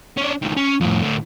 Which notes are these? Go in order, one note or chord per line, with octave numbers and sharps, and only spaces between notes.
C#4 D4
C#2 D#3
C#4
F2 A2
A2 D3